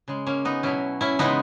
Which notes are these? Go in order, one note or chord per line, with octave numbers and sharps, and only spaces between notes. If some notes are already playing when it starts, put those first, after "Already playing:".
C#3 G#3
A#3 C#4
B3 D#4
B2 F#3 C#4 E4
C#4 E4
C#3 E3 G#3 B3 D#4